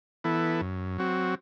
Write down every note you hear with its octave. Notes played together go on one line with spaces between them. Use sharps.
E3 B3 E4 A4
F#2
F#3 C4 F#4